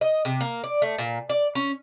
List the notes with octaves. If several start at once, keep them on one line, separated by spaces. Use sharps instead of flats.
D#5
C3
A#3
D5
A3
A#2
D5
C#4